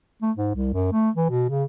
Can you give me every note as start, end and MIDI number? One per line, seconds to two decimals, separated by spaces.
0.22 0.32 57
0.37 0.50 44
0.55 0.70 36
0.73 0.88 42
0.92 1.10 57
1.15 1.29 52
1.30 1.49 47
1.49 1.64 49